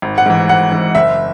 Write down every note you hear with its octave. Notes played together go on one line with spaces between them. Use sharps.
G#1
F#5
G#2 E3
G#1 F#5
G#2 E3
F#1 E5